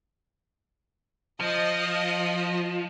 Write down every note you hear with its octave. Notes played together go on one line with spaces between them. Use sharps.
F3 D#5